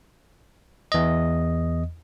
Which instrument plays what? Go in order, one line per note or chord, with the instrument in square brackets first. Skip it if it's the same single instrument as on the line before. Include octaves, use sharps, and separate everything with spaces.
[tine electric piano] E2 D#5